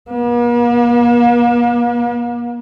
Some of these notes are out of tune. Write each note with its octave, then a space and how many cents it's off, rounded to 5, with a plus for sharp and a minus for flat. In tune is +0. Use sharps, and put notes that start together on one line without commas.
A#3 +45